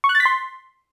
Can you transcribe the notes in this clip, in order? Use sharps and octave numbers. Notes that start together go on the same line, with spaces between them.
C#6
F#6
A6
B6
C6